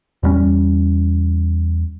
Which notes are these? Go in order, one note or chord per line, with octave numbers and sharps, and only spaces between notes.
E2 G2 G3 C#4